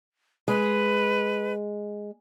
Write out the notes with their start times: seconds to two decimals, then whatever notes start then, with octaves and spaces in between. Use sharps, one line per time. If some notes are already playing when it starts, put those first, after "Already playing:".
0.48 G#3 B4